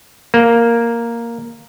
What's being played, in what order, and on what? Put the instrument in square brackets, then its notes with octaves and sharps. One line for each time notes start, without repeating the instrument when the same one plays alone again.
[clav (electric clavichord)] A#3